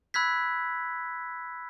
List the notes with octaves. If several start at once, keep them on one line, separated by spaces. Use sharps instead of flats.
B5 E6 F#6 G#6 B6